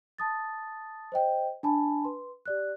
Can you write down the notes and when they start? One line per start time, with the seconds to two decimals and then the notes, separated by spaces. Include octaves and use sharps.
0.18 A5 D#6 A6
1.12 C5 D#5 G5
1.63 D4 G#5 A5 B5
2.04 B4 C6
2.46 G4 D5 F#6